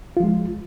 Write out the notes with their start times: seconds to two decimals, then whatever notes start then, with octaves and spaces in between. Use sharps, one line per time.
0.17 F4
0.20 F3
0.24 G#3